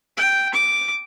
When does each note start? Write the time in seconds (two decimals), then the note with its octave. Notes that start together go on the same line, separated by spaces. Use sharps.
0.17 G5
0.54 D6